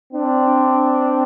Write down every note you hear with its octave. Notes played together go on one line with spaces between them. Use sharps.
C4 D4